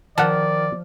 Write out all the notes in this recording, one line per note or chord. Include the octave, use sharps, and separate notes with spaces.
D#3 F3 D5 F#5 A5